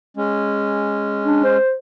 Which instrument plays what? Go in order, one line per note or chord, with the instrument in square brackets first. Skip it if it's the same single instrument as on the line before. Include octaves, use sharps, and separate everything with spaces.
[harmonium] G#3 C#4
[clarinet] D4
C5